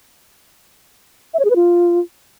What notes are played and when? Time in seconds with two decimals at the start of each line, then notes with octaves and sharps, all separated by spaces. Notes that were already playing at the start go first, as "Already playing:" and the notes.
1.34 E5
1.39 C#5
1.45 G#4
1.50 B4
1.56 F4